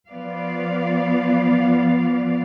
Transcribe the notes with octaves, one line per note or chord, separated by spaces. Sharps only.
F3 B3 D5 F5